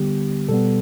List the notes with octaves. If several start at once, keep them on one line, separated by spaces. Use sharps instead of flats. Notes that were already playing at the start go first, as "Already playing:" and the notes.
Already playing: D3 G3 B3 G4
B2 G3 B3 A4